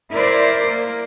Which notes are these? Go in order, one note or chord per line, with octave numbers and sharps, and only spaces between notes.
E4 A#4 C5 D5
A#3